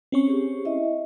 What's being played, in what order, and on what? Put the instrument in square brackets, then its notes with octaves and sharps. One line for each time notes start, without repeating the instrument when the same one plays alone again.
[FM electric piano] C4 C#4 C#6
[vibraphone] G4 G#4
E4 D#5 E5